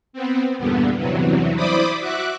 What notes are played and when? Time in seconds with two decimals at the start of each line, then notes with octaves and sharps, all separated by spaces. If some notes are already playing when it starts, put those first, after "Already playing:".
0.13 B3 C4
0.58 E2 G2 A#2 D3 B3
0.97 E2 G2 C3 E3 F#3
1.56 E4 C5 D5 B5 D6 D#6
2.01 F#4 E5 D6 F#6